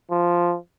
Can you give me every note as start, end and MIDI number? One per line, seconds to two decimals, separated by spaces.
0.11 0.56 53